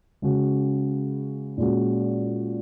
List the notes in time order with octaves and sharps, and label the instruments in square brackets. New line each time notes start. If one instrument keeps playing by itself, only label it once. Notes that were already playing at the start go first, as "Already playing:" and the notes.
[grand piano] C#3 G#3 C#4 F#4
A#2 G#3 C#4 F#4